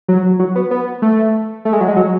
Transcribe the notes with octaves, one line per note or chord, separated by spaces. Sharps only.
F#3
F#3
B3
B3
A3
A3
G#3
F#3
G#3
F#3